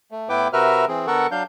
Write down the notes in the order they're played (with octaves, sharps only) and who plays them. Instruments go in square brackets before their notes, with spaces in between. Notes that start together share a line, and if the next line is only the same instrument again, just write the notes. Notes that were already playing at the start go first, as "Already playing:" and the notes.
[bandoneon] A3
A2 B3 E4 B4 G5 D6
C3 F#4 A#4 B4 E5 F6
E3 C4 G#4
D3 B3 A4 A#4 F#5 C#6
F#3 D4 F5 G6